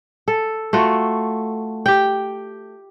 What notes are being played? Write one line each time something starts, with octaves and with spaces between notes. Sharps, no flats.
A4
A3 F4 F#4
G4 G5